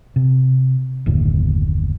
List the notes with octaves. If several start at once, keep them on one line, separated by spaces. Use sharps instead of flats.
C3
F#1 D#2 A2 D3